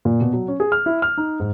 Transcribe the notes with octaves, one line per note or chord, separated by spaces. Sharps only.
A#2
B2
F#3
C#4
G#4
F6
E4
F6
D#4
G#2